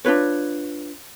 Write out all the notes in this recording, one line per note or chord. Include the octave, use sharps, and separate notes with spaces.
D4 F4 B4 C#5